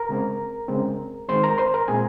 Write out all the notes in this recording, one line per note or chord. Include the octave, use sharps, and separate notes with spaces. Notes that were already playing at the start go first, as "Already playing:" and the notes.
Already playing: A#4 A#5
C#3 G#3 C4
C#3 G#3 C4
D#3 G#3 C4 C5 C6
A#4 A#5
C5 C6
A#4 A#5
A#2 G#3 C4 G#4 G#5